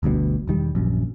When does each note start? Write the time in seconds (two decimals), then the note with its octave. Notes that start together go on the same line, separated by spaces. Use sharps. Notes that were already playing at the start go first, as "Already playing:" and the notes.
0.03 G1 D2 G2 B2
0.47 E1 D#3 G3
0.75 D#1 A#1 F#2